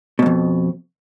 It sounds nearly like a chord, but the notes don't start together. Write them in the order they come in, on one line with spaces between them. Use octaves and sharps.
B2 G#2 F2